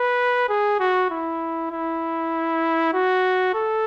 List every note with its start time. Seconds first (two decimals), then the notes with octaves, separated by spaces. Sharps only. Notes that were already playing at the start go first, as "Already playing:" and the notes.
Already playing: B4
0.49 G#4
0.80 F#4
1.10 E4
1.71 E4
2.94 F#4
3.54 A4